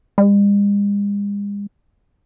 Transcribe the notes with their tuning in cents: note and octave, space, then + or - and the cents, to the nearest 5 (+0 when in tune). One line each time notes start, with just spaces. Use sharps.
G#3 -45